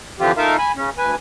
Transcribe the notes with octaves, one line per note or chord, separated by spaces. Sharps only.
D3 E3 F3 C4 F4 G4
A3 D#4 F4 A#4 E5 F5
G#5 B5
C#3 C#4
D2 B4 G#5